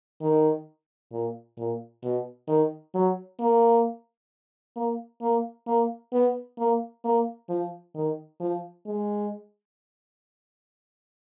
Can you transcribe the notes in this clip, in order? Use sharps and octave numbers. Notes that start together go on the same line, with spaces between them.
D#3
A#2
A#2
B2
D#3
F#3
A#3
A#3
A#3
A#3
B3
A#3
A#3
F3
D#3
F3
G#3